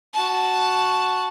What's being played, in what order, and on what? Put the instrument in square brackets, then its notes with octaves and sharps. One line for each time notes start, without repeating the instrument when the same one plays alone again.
[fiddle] F#4 A5